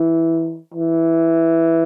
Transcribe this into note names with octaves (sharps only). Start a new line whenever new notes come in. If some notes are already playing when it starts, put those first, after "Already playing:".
Already playing: E3
E3